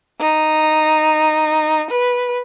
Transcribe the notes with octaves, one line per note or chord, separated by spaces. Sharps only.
D#4
B4